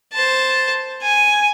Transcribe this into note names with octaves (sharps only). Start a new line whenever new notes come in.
C5 A5
G#5